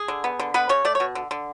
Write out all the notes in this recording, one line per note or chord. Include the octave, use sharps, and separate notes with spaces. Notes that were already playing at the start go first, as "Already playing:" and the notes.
Already playing: G#4
D3
B3
D3
B3 B4
C#3 C#5
A3 D5
C#5
B2
D3
D3